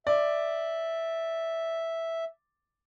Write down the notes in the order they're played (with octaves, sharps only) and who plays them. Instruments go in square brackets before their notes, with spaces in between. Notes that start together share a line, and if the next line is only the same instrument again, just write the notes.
[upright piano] D5 [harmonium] E5